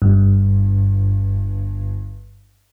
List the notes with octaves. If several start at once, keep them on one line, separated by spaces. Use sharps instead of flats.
G1 G2